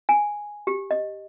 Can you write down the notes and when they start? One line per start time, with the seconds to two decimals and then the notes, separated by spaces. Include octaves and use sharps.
0.09 G#5
0.67 G4
0.91 D#5